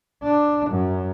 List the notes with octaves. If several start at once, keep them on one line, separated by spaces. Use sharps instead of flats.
D4
F#2